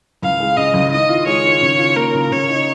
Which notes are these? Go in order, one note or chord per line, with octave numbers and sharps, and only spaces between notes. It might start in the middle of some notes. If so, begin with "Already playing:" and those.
C#2 F5
G#3
C#3 D#5
C#2
D#3 D#5
F4
G#3 C#5
D#3
C#3
F4
A#3 A#4
C#3
C#3 C#5
D#4